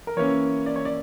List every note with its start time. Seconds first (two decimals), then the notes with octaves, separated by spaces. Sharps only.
0.07 A#4
0.16 E3 A#3 C#4 C#5
0.66 D5
0.76 C#5
0.85 D5